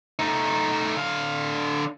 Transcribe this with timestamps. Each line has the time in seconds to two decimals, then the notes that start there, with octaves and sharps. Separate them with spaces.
0.19 A3 D#4
0.96 D3 F5